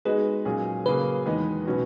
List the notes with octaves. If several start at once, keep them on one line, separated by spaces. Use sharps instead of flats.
G#3 B3 D#4 F#4 G#4 B4
A#2 F#3 C#4 G#4
C#3 F#3 A#3 C#4 G#4 B4
E2 D#3 G#3 B3
B2 F#3 C#4 F#4